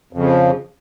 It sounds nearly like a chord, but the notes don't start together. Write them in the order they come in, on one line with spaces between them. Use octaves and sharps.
F2 C#3 F3